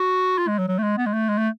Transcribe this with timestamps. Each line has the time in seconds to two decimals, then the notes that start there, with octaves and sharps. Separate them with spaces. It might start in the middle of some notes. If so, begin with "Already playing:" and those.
Already playing: F#4
0.38 F4
0.48 G#3
0.58 F#3
0.68 F#3
0.78 A3
0.83 G#3
0.98 B3
1.06 G#3
1.13 A3
1.29 G#3
1.38 A3